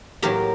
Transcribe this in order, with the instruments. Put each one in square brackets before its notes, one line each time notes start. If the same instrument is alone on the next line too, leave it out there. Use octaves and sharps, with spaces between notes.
[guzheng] A2 F#3 A#3 G4 A#4